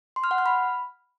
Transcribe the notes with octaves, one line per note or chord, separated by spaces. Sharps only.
C6
F6
F#5
F6
B5